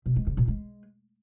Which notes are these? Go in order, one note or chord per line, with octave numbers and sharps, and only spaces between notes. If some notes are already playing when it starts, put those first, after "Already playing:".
B2
G#3
C#3
A#2
G#3